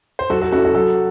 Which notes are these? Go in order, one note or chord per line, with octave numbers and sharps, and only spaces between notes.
C5
F#3 F#4 A4
F#4 A4
C#4 E4 F#4 A4
F#4 A4
F#3 F#4 A4